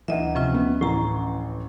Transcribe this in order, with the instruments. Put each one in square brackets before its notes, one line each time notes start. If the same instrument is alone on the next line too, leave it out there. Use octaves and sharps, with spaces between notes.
[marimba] D2 D#5 E5 [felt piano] E3 D#4
[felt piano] C3 [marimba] F3 C#4 F4
[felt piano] B3
[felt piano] A1 E3 [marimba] A2 A#5